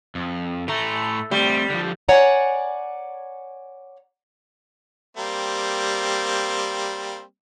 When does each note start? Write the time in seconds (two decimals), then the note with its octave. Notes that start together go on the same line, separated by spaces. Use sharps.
0.15 F2
0.68 A2 A3 A#5
1.31 G3 A3 C4
1.70 D3 F3
2.09 C#5 D5 F#5 G#5 A#5
5.17 G3 A#3 C4